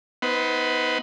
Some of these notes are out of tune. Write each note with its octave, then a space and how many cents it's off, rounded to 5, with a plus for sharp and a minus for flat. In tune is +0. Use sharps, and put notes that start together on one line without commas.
B3 +0 D#4 +30 C5 -15